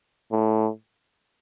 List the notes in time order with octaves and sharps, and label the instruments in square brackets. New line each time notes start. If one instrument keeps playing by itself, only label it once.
[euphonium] A2